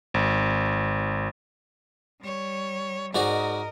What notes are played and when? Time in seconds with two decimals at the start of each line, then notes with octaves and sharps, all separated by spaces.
0.14 G#1
2.21 G3 C#5
3.15 G#2 F#4 A#4 D5 D#5